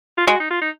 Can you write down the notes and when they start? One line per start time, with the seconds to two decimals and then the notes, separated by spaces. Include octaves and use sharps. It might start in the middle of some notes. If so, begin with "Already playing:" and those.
0.18 F4
0.27 G#3 F#4
0.40 D#4
0.51 F4
0.62 D#4